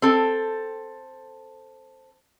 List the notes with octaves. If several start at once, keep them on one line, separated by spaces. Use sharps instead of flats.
C4 A4